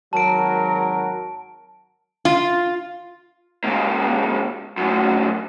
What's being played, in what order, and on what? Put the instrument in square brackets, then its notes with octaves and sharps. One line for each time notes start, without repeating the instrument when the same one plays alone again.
[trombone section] G#1 F#3 A#4 [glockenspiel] A5 D7
[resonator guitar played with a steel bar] F4
[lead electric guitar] C#2 A#3
F#2 A2